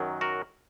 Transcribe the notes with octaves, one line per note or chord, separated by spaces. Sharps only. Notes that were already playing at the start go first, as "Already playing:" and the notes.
Already playing: F#2 D#3 F#3
F#4 A#4